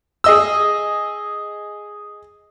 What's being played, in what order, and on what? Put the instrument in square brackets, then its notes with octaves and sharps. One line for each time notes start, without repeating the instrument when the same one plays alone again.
[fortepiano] G#4 D#5 E6